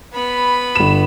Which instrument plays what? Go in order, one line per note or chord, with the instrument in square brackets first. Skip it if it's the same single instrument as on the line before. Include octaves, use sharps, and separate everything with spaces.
[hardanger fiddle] B3 B5
[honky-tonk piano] G1 E7